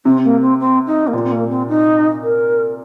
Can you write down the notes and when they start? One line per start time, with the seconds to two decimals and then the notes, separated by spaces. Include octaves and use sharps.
0.05 C3 C4
0.24 A#3
0.41 C4
0.60 C4
0.86 D#4
1.07 A#3
1.13 A#2 C4
1.23 C4
1.31 A#3
1.50 C4
1.68 D#4
2.22 A#4